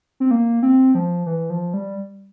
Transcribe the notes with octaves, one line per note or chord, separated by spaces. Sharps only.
C4
A#3
C4
F3
E3
F3
G3